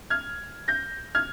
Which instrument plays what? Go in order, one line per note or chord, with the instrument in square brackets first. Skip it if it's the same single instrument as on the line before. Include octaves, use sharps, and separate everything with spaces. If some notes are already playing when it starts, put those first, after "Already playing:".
[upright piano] F6 G#6
G6 A#6
F6 G#6